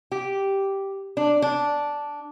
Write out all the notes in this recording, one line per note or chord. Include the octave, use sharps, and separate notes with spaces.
G4
D4
D4